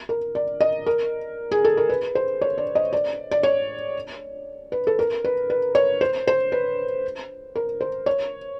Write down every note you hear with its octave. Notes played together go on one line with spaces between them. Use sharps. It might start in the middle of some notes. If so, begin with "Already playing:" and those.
A#4
D5
D#5
A#4
G#4
A4
A#4
B4
C5
C#5
D5
D#5
D5
D5
C#5
B4
A4
A#4
B4
B4
C#5
C5
C5
B4
A#4
C5
C#5